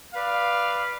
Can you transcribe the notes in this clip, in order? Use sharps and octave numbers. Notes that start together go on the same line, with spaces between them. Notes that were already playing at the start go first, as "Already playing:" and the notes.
B4 D5 F5